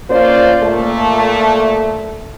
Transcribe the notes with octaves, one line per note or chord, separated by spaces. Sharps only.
A#3 C#4 F4 C5 D5
A#2 A3